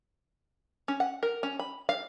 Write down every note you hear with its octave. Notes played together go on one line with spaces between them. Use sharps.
C#4
F#5
A#4
C#4
B5
F5